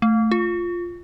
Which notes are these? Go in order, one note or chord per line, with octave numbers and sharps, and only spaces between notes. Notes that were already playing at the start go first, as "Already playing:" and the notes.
A3
F4